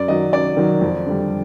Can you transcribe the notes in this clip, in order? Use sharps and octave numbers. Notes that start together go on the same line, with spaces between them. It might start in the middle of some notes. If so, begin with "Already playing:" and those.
Already playing: F#2 D5
D#3 F#3 D#5
F#2 D5
D#3 F#3
F2
D3 G3